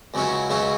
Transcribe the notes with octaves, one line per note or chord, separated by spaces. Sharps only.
C#2 C#3 F#3 C#4 E4
C#2 C#3 F#3 C#4 E4